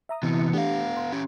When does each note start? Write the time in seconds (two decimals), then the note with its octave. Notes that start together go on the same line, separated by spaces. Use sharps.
0.09 E5 A#5 D#6
0.23 C3 E3 B3 E4 C#7
0.53 A3 B3 D4 G4 F5
0.97 C6
1.12 C#4 G4